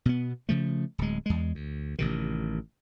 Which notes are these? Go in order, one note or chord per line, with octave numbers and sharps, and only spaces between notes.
B2 B3
C#3 F3 A3
D1 G#3
E2 G#3
D2
A1 C3 D#3